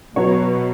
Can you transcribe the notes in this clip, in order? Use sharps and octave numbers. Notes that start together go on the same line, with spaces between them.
B2 F#3 B3 F#4 C#5